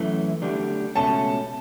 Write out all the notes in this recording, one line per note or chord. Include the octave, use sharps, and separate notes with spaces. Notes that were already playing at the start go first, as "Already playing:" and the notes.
Already playing: F#2 E3 A3
D2 D3 G3 D4
C#2 B2 A3 C#4 A5